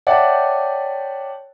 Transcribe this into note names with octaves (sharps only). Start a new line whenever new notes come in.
C#5 D5 E5 F#5 G5 A5